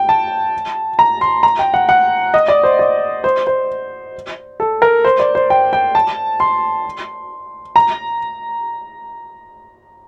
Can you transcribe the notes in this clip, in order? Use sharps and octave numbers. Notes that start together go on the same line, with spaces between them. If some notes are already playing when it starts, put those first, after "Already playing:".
Already playing: G5
A5
A#5
C6
A#5
G5
F#5
F#5
D#5
D5
C5
D5
C5
C5
A4
A#4
C5
D5
C5
G5
G5
A5
C6
A#5